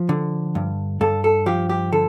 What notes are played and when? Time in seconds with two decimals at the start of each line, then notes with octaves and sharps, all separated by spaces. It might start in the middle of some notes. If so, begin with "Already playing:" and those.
Already playing: F3
0.09 D3
0.55 G2
1.01 G2 A4
1.24 A4
1.46 F3 G4
1.69 G4
1.92 D3 A4